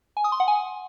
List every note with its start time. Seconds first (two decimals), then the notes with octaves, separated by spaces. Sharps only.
0.17 G#5
0.24 D#6
0.32 C6
0.40 F#5
0.48 G#5